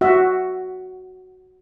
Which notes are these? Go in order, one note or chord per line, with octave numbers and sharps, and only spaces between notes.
F#4 E5